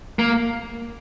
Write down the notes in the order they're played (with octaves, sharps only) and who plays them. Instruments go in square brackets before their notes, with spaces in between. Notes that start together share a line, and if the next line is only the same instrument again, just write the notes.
[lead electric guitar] A#3